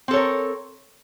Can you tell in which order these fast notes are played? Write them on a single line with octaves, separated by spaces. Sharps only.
C4 A4 C#5 A#4